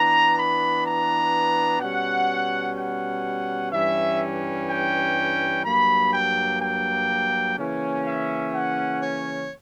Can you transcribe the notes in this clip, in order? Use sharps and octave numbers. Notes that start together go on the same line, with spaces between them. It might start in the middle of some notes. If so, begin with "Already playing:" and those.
Already playing: E3 B3 D4 A#5
B5
A#5
B2 G3 C#4 F#5
F#5
G2 E3 G3 C#4 E5
G5
G2 F#3 A#3 B5
G5
G5
C#3 E3 A#3 C#4
E5
F#5
C#5